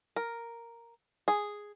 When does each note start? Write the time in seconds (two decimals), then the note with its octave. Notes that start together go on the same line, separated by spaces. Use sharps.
0.16 A#4
1.28 G#4